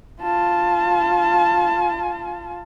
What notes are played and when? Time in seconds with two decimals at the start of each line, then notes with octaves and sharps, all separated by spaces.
0.21 F4 A5